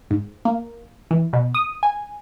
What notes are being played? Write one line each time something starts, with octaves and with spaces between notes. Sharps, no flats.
G#2
A#3
E3
B2
D#6
G#5